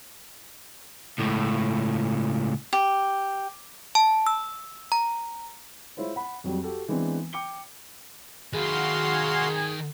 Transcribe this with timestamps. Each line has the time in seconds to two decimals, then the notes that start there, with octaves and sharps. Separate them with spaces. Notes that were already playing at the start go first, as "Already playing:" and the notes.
1.19 C#2 A2
2.73 G4
3.95 A5
4.27 E6
4.92 A#5
5.97 G#3 E4 F4 C5 C#5
6.16 F#5 B5
6.44 F2 F#3 G3
6.64 F#4 G4 A4
6.88 E3 G#3 B3 C4 D4
7.33 G5 D6 C#7 G7
8.54 D#3 F#4 G#4 B4 F5 C6